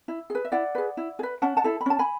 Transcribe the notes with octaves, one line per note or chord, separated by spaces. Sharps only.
E4
G#4 B4
E5
E4 D5 F#5
G#4 B4
E4
G#4
B4
C#4 F#5 A5
F#5 A5
E4 A4
B5
C#4 A5
G#5 B5